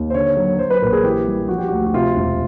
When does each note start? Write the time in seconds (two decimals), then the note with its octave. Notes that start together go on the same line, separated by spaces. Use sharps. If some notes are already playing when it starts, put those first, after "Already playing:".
Already playing: D#2
0.10 C5
0.14 D3 C#5
0.37 F#3
0.59 F#3 C5
0.70 B4
0.81 A#1 A#4
0.93 G#4
1.03 E3 G4
1.27 G3
1.49 F3 F#4
1.58 G4
1.68 D2 F#4
1.86 F#4
1.94 C3 F4
2.16 E1